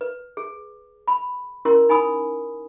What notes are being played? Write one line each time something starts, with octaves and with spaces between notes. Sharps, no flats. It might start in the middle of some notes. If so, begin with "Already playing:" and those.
B4
G#4
B5
C#4 E4 A#4 C6
D#4 G#5 B5 D#6